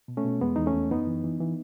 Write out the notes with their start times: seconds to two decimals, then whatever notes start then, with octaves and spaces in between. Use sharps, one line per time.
0.08 B2
0.17 A3 C#4
0.25 B2
0.41 E2 G#3 B3
0.56 E2 D#4
0.66 A3 C#4
0.74 E2
0.91 F#2 B3 D#4
1.07 E3
1.24 E3
1.40 E3